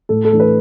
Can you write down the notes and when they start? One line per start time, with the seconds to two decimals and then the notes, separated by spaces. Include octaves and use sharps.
0.09 A2 A4
0.25 A4
0.32 E3 A3 D4
0.40 B4